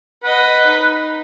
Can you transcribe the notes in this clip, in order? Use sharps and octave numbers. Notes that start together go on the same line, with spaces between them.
B4 D#5 F#5
D#4